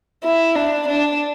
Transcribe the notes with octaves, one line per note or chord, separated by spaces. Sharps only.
E4
D4
D4